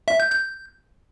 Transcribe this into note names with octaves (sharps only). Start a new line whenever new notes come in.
E5
G6
G6